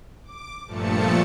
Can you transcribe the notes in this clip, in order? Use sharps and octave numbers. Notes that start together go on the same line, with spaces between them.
D6
G2 A#2 F3 A3 A5 C#7